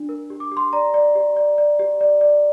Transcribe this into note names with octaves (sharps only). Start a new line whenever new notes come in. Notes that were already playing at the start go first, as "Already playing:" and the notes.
Already playing: D4
A#4
G4
D6
G4
C6
D5 A#5
D5
G4
D5
D5
G4
D5
D5